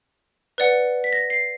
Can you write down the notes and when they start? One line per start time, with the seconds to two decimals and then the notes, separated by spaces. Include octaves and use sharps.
0.58 B4 D5 F#5
1.04 B6
1.13 A#6
1.30 C7